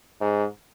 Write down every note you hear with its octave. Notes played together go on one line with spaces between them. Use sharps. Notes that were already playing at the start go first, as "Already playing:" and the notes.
G#2